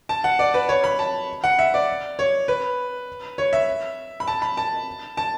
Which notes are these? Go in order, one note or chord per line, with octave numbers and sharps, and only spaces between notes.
A5
F#5
D5
B4
C#5
B5
A5
F#5
E5
D5
C#5
B4
C#5
E5
B5
A5
B5
A5
A5